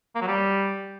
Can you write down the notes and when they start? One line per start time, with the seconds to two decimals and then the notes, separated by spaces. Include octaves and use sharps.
0.15 A#3
0.21 F#3
0.27 G3